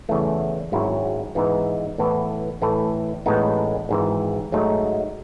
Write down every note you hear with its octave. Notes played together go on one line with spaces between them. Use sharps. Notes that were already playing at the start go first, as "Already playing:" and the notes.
E2 C#3 E3 A3
G#1 G#2 F#3 C#4 E4
G#2 E3 B3 D#4
A2 E3 B3
A2 E3 A3
A1 A2 G#3 B3 D#4
G#1 G#2 E3
G#2 F#3 A3 D#4